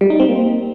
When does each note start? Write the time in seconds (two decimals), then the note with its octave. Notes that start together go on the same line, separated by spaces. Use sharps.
0.01 G3
0.10 D#4
0.20 C4
0.29 A#3